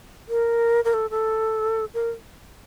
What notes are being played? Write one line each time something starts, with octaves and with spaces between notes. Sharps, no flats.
A#4
A#4
A4
A4
A#4